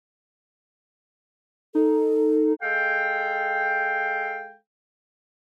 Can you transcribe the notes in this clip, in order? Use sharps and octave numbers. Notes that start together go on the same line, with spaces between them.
D#4 A4
G#3 A4 F5 G5